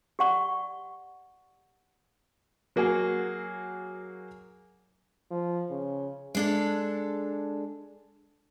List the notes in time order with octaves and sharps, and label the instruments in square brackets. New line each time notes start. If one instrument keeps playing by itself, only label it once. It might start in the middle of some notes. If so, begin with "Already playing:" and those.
[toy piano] G4 D5 F#5 C#6
[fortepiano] F#3 A#3 F#4 G#4
[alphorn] F3
C#3
[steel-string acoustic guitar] G#3 D4 A4